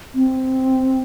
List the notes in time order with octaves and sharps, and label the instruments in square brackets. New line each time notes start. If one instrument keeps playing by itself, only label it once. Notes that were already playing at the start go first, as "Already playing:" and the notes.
[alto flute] C4